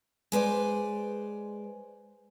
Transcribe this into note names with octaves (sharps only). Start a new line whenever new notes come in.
G#3 B4 C5 D5